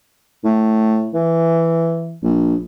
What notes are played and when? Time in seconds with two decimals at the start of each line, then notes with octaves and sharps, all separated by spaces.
0.44 A2
1.14 E3
2.24 A#1